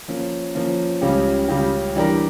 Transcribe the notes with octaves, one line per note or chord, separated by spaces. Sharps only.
F3 A#3 C#4
F3 A#3 C#4
C#2 C#3 G3 C#4 G4
C#2 C#3 G3 C#4 G4
E3 G3 D4 G4 A#4